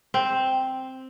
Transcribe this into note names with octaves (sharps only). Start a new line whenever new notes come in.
C4